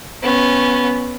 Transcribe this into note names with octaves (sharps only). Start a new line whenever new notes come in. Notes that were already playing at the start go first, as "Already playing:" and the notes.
B3 C#4